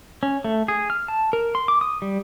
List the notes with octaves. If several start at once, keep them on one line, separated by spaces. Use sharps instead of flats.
C#4
A3
G#4
F6
A5
A#4
C6
D6
D#6
G3